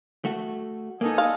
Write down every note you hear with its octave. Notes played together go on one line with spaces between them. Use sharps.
A3 F#4
A#3 B3 D#4 A4 D#5 G#5
F5